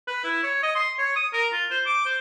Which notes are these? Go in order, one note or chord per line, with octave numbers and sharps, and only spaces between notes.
B4
E4
C#5
D#5
C6
C#5
D#6
A#4
F4
C5
D6
C5